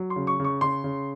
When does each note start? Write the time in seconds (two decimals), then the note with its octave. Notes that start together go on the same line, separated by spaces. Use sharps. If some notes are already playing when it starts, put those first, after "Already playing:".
Already playing: F#3
0.10 C6
0.16 C#3
0.27 C#6
0.40 C#3 C#6
0.61 C#3 C6
0.84 C#3